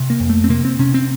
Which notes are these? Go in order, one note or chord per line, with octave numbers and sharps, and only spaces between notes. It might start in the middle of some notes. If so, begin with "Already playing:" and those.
Already playing: C3
A#3
F2
A3
C4
C3 A#3
C4
C3 C#4
C4